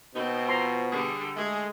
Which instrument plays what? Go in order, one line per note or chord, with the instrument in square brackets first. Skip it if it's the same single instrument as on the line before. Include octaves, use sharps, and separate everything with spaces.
[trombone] B2 [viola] C4 [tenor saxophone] D#4
[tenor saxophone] F3 [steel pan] A#5 C6
[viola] D3 G3 [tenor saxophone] G#4
[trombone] G#3 [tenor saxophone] A3 [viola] G#4